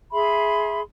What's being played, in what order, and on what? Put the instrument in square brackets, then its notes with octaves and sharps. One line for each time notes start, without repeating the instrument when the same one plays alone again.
[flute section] G#4 E5 B5 C6